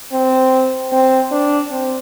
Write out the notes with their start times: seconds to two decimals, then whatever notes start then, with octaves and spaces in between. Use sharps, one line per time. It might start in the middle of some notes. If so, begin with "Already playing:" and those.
0.12 C4
0.92 C4
1.31 D4
1.70 C4